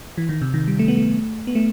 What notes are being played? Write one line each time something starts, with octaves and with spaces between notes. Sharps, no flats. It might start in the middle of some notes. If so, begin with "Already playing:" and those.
E3
D#3
C3
D#3
G3
A3
B3
A3
B3
A3